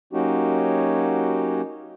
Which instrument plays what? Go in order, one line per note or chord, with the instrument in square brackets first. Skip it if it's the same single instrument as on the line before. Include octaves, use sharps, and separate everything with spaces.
[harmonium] F#3 A#3 C#4 D#4 F#4 G4